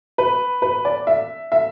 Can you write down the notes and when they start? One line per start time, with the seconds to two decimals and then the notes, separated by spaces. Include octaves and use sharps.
0.18 B4
0.62 B4
0.85 D5
1.07 E5
1.52 E5